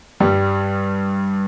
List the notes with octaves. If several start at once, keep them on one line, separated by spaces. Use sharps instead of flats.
G2 G3